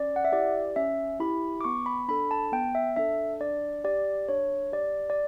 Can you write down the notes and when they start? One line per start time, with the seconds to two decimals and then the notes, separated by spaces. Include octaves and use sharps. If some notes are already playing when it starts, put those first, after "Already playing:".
Already playing: C#4 D5
0.16 F#5
0.25 E5
0.32 E4 G4 D5
0.76 C#4 E5
1.20 E4 G4 B5
1.61 D6
1.64 B3 C#6
1.86 B5
2.08 D4 A4 B5
2.31 A5
2.52 B3 G5
2.75 E5
2.96 D4 A4 E5
3.40 D4 D5
3.84 G4 D5
4.29 D4 C#5
4.72 G4 D5
5.10 D5